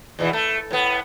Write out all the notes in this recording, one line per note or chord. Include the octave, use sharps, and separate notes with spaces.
E2 B2 E3
A3
A2 B3